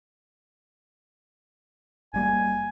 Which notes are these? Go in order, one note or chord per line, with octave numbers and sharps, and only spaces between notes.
F#1 G3 A#3 G#5